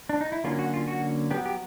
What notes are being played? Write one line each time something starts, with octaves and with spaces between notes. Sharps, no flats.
D4
D#4
E4
D3 F#3 A#3 C#4 F4
F#4
F4
F#4
F#3 B3 G4
G4